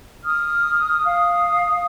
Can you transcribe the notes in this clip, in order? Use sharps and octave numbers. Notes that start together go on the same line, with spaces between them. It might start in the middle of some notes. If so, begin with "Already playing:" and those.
D#6 F6
F5 D#6